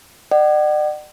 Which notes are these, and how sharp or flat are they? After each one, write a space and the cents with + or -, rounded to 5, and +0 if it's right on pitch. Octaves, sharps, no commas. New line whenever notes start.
D5 +45 F#5 +40